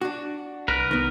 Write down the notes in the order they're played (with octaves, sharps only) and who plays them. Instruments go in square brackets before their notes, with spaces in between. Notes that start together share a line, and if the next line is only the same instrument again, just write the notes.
[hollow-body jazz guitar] D4 F#4
[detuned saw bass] C2 [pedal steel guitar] A#4 B4
[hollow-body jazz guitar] D#3 B3